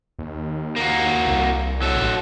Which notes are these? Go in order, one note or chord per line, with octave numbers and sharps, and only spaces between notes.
D#2
A#3 F#4
C2
F#3 A4
A1